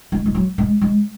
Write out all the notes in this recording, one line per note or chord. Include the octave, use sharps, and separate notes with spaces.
G#3
G#3
F#3
G#3
G#3